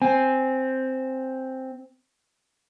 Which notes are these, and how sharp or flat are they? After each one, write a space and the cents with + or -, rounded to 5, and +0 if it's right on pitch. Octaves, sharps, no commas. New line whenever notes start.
C4 +0 G#5 -10